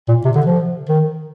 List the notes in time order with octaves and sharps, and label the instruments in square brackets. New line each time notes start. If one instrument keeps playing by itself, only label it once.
[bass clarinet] A#2
C3
D3
F3
D#3